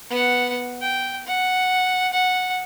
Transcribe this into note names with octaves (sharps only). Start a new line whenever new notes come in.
B3 F#5
G5
F#5
F#5